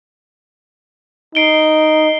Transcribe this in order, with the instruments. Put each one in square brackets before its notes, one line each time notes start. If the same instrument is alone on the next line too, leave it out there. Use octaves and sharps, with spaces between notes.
[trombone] D#4 [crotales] C7 D7 G7